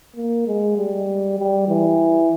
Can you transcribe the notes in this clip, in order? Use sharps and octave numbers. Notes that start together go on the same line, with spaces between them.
A#3
G#3
G3
G3
E3